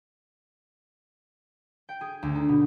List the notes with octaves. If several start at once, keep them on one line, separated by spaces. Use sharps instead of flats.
G5
G#4
D2
D#4
B2